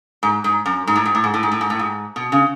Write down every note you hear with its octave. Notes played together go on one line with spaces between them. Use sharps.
G#2
G#2
F#2
G#2
A2
G#2
A2
G#2
A2
G#2
A2
G#2
A2
G#2
B2
C#3